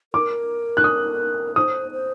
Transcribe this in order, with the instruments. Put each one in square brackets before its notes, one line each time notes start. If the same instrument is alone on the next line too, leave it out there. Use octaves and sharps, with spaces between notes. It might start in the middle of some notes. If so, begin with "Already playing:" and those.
[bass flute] A#4 [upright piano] D6
[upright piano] F#6
D#6
[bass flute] C5 [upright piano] D#6
[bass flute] C5